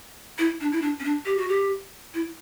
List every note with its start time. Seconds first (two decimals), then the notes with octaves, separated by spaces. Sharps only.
0.39 E4
0.61 D4
0.72 E4
0.82 D4
1.00 C#4
1.04 D4
1.25 G4
1.37 F#4
1.49 G4
2.14 E4